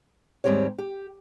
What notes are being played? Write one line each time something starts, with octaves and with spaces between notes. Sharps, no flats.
D#2 G#2 G3 C4 G4 C#5
G4